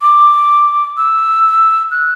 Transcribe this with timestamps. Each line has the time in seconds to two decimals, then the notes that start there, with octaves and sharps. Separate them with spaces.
0.02 D6
0.97 E6
1.91 F#6